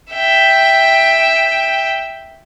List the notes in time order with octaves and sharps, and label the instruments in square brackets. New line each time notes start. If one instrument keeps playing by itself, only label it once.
[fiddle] E5 G5